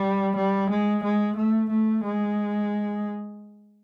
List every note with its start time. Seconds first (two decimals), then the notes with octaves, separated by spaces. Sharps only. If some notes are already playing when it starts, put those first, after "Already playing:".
Already playing: G3
0.36 G3
0.70 G#3
1.03 G#3
1.37 A3
1.70 A3
2.04 G#3